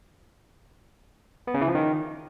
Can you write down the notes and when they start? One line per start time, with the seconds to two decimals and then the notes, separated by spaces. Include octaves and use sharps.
1.47 B3
1.54 C#3
1.61 E3
1.68 F3
1.75 D#3